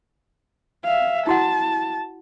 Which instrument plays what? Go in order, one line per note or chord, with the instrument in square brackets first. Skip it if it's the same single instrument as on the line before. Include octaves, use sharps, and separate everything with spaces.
[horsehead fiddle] E5 F5
[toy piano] E4 F#4 F#5 [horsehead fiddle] A5